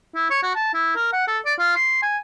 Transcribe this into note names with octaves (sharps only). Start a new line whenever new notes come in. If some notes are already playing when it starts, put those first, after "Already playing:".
E4
C#5
F#4
A5
E4
A#4
F#5
A4
D5
F4
C6
G#5